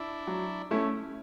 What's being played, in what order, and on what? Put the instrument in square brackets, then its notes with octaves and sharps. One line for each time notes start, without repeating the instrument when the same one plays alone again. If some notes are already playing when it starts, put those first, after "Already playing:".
Already playing: [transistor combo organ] D4 E4
[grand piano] F#3
A3 C#4 E4